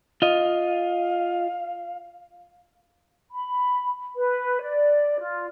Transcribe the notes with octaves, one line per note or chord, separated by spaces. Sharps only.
F4 D#5 F5
B5
B4
D5
F4